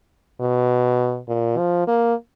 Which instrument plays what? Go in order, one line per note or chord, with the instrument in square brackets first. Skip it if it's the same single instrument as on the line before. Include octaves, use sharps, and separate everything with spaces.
[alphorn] B2
A#2
F3
A#3